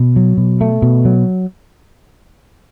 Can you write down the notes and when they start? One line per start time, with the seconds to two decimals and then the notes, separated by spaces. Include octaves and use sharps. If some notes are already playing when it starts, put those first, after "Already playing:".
Already playing: B2
0.16 F#3
0.37 B2
0.61 A3
0.82 B2
1.05 F#3